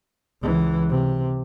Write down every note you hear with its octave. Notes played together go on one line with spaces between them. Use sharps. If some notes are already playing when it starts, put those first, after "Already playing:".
C#2 E3
C3